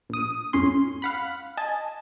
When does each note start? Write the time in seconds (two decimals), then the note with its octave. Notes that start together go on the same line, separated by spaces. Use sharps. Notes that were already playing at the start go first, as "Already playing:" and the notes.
0.09 A#1 D#6
0.53 G#1 F2 C#4 C6
1.02 F5 F#5 B5
1.57 D#5 G#5 A5